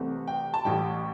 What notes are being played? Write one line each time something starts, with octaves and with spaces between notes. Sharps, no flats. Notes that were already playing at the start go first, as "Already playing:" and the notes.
Already playing: C2 C3 E3 A3 C4
G5
A5
A1 A2 G3 G5